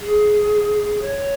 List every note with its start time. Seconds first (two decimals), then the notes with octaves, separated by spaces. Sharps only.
0.01 G#4
1.02 C#5